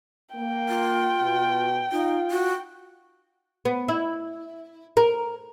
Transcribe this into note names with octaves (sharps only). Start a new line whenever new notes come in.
A#3 G5
F4
B2
D#4 F4
F#4
B3
E4
A#4